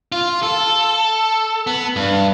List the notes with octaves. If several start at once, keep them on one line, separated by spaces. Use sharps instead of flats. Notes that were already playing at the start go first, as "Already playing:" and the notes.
F4
A4
B3
G2